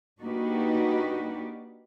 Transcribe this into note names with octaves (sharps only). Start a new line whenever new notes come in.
A#3 D4 D#4 F#4 G4 B4